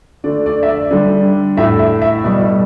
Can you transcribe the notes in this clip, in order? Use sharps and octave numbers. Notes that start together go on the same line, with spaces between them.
D3 A3 D5
D5
E5
D5
D3 G3
A2 A3 E5
E5
E5
B2 G3 D5
A4